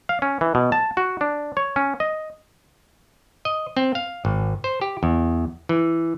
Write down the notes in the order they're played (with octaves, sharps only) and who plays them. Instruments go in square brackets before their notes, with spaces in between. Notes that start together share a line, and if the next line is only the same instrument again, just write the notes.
[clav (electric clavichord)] F5
C#4
E3
B2
A5
F#4
D4
C#5
C#4
D#5
D#5
C4
F5
G#1
C5
G4
E2
E3